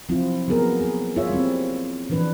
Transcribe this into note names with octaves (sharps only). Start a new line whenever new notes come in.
F3 F#3 C4 E4 F4
F#3 A#3 B3 G#4 A#4
G#4
E4 F4 G#4 C#5 E5
G3 C4
E3 F3 D4 B4